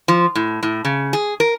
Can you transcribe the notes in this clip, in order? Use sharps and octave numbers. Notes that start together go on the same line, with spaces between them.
F3
A2
A2
C#3
G#4
A#4